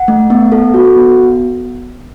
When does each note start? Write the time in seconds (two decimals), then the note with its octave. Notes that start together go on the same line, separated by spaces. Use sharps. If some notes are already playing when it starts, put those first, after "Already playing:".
Already playing: F#5
0.08 A3
0.30 B3
0.52 A4
0.74 F#4
0.96 B3